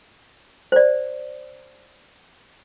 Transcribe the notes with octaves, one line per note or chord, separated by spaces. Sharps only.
C5 D5